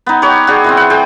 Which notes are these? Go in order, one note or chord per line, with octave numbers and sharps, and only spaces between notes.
B3 D#4
G4 B4 C#5
F#4 G#4 D5
E3 B3 C4
F#5
G#4 G5